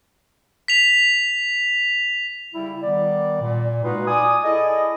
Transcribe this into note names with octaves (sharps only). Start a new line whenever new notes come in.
B6 F7
C#3 G3 E4
D#3 G3 B3 D5
A#2
G#3 A#3 D#4 F4 F#4 B4
D5 G#5 D#6
E4 G#4 A4 D5 D#5